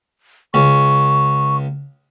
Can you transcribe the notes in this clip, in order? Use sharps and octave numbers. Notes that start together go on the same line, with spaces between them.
C#2 C#6